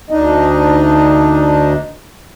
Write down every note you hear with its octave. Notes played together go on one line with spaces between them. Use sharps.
D2 D4 D#4 D#5